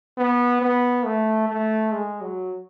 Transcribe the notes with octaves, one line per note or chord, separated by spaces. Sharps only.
B3
B3
A3
A3
G#3
F#3